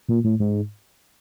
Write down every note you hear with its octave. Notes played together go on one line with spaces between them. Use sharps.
A#2
A2
G#2